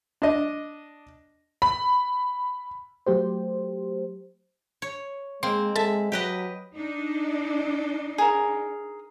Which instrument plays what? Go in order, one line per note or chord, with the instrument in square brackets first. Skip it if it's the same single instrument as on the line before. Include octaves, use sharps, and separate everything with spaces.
[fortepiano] D4 D#5
[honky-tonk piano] B5
[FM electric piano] F#3 A3 G4 C5
[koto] C#5
[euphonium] G#3 [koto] A#3 C4 [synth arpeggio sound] C6
[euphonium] G#3 [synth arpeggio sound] A4 A5 [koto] E5
[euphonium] F#3 [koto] G4 B4 D#5
[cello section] D4 D#4
[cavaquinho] G#4 A#4